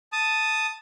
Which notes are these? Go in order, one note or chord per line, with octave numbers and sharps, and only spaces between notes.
A5 D#6